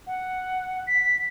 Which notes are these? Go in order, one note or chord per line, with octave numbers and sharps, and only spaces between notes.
F#5
B6